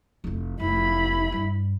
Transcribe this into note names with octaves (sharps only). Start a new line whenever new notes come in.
F1 E4
F1 E4 B5
G2